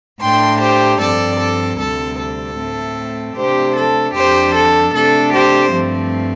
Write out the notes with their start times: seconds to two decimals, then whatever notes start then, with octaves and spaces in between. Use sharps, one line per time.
0.22 A2 A3 D4 G5 C6
0.61 G4 C5
1.01 G2 F3 C4 A4 D5
1.40 A4
1.79 D2 C3 G3 C4 A4
2.19 A4
2.58 A2 A3 C4
3.36 C3 A3 D4 G4 C5
3.76 A4
4.15 F2 F3 D4 G4 C5
4.55 A4
4.93 C3 A3 D4 A4
5.34 G4 C5
5.73 G2 F3 A3 C4